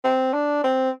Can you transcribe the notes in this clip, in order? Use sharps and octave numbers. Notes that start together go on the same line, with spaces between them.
C4
D4
C4